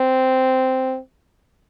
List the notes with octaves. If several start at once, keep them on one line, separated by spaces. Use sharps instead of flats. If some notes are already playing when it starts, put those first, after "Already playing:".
Already playing: C4